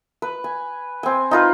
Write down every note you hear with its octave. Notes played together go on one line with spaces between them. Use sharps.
B4
G#5
C4 G#5
D#4 F4 B4